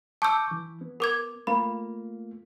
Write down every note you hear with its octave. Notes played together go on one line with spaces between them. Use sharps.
A5 C#6 D6 E6 G6
E3
B3
A#4 D6 G#6
A3 A#3 F4 B5